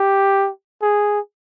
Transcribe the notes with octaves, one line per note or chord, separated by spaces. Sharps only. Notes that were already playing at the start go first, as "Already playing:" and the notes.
Already playing: G4
G#4